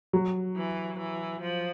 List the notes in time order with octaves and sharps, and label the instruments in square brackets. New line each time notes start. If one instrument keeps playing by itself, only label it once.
[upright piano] F#3
[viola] E3
E3
F3